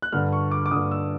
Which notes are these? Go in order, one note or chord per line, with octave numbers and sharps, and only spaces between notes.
F#6
G2 D3 F6
C#6
D6
D6
G2 D3 D#6
E6